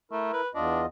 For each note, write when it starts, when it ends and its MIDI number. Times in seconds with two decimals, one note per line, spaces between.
0.12 0.30 57
0.12 0.41 64
0.12 0.41 70
0.33 0.49 71
0.55 0.86 40
0.55 0.81 62
0.55 0.86 65
0.55 0.86 75